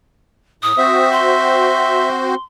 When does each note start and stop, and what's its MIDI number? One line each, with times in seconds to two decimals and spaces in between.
0.63 0.72 45
0.63 1.09 87
0.78 2.35 60
0.78 2.35 66
0.78 2.35 72
0.78 2.09 76
1.12 2.42 84